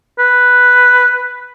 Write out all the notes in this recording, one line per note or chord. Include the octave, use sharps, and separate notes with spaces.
B4